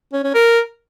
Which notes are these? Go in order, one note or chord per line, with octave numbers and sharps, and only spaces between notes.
C#4
C#4
A#4